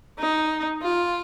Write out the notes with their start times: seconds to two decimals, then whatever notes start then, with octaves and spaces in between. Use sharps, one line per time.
0.19 D#4
0.82 F4